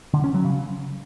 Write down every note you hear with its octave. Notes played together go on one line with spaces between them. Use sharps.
D3
C#4
F#3
C#3